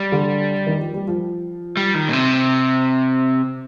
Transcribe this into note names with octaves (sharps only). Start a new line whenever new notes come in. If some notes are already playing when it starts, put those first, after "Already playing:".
Already playing: G3
D3
D#3
F3
G3
F3
G3
D#3
A#2
C3